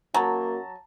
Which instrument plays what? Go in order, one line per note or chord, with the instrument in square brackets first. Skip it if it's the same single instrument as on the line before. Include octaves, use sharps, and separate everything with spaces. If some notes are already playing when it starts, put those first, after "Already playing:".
[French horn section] F#2 A#3 F#4 [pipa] F#3 [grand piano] A5 A#5